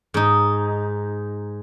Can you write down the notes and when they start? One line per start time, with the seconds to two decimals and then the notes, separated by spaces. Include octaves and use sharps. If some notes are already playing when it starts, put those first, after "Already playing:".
0.14 G#2 D#4